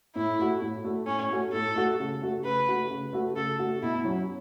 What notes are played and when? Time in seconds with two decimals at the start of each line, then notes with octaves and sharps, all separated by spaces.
0.16 A2 E4
0.39 A3 F#4
0.61 A2
0.84 A3 F#4
1.07 A2 C#4
1.31 A3 F#4
1.53 A2 A4
1.76 A3 F#4
2.00 C#3
2.22 A3 F#4
2.45 C#3 B4
2.68 A3 F#4
2.90 C#3
3.13 A3 F#4
3.36 C#3 A4
3.59 A3 F#4
3.82 B2 E4
4.05 F#3 C#4 F#4